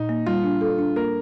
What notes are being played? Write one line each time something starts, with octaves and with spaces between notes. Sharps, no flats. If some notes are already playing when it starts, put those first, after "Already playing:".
Already playing: A#2 D#4
A#3
G3 F4
D4
A4
D4
A#3 A#4